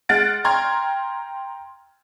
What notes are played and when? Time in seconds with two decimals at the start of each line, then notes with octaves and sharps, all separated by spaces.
0.09 G#3 F#5 F6 A6 D7
0.44 G5 A#5 C6 F6 G#6